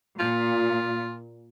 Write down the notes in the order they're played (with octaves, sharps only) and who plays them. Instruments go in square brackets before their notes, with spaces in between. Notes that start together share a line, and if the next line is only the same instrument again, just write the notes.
[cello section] A#2 [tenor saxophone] F4